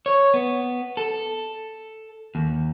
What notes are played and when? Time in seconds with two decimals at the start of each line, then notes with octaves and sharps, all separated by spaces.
0.06 C#5
0.34 B3
0.97 A4
2.35 D#2